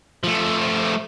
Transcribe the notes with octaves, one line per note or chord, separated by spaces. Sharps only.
F3 A3